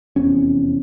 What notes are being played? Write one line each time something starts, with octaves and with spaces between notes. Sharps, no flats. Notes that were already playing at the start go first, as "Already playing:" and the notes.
F1 E2 C3 C#4